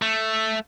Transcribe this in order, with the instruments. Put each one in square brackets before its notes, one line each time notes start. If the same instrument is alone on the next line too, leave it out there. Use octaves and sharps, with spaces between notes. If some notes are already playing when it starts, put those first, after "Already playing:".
[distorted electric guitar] A3